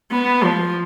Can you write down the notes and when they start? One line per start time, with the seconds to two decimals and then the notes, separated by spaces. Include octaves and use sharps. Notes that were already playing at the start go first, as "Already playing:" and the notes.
0.12 B3
0.44 F3